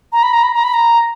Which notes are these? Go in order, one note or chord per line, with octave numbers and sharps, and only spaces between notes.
A#5
B5
A#5
B5
A#5
B5
A#5